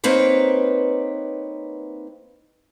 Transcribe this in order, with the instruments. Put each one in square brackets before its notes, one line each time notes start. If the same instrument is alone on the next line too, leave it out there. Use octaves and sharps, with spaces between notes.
[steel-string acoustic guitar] A#3 C4 D#4 B4 C#5